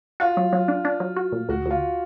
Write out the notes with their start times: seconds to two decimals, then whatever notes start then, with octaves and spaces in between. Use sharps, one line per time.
0.20 F4 F#4
0.37 F#3
0.53 F#3
0.68 D4
0.85 D4
1.00 F#3
1.17 F#4
1.32 A#2
1.49 D2 F#4
1.66 D2 F4